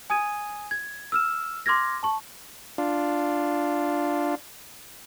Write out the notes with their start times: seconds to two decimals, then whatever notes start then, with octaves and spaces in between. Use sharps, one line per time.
0.10 G#5 D#6 G#6 D#7
0.71 G#6
1.12 E6 F6 E7
1.66 C6 D6 F6 G#6 A#6
2.03 A5 C#6
2.78 D4 F4